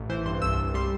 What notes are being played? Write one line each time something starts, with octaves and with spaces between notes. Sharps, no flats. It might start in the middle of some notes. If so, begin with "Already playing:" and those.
Already playing: A1
E3 C5
G2 C6
C2 E6
C2
G3 C6